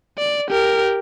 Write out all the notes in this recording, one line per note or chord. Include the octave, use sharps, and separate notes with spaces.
D5
G4 A#4